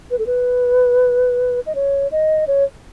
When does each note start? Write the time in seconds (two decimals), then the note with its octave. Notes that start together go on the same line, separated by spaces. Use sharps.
0.11 B4
0.19 A4
0.26 B4
1.66 D#5
1.75 C#5
2.12 D#5
2.47 C#5